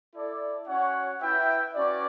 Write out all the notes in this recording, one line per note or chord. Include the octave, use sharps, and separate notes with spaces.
E4 A4 D5
C#4 F#4 C#5 F#5
E4 B4 E5 G5
C#4 F#4 B4 D5